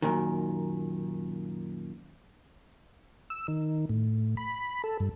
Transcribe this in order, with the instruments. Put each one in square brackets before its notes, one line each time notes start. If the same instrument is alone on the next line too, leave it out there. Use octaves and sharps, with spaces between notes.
[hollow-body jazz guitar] F#2 A#2 D#3
[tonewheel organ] E6
D#3
A2
B5
A4
G2